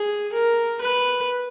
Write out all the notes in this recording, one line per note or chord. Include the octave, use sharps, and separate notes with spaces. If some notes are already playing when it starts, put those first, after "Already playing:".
Already playing: G#4
A#4
B4